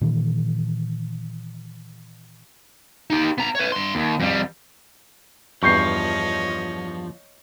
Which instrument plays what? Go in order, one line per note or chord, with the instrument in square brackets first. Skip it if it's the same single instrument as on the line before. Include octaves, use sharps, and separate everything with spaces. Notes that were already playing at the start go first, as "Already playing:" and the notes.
[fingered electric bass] A#2 D#3 E3
[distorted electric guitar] D#4 G4
B3 A#5
B4 C#5
G2 C6
D#2
F2 G3
[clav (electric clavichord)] E2 G2 [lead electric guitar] F3 [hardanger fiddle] C#5 D#5 [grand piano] C#6 G6 C7